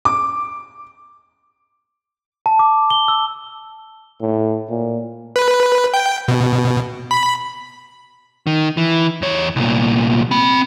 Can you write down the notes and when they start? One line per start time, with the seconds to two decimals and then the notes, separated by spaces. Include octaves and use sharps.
0.05 D6
2.46 A5
2.59 D6
2.90 G7
3.08 E6
4.21 A2
4.70 A#2
5.36 B4
5.94 G5
6.28 B2
7.11 B5
8.47 D#3
8.77 E3
9.22 E2 C#5
9.56 C2 A#2
10.31 C4 B5